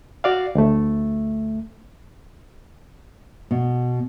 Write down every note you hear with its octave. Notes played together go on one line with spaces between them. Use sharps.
F#4 D5 F5
D2 A3
B2